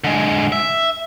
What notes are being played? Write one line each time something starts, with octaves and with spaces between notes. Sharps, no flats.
D3 G#3
E5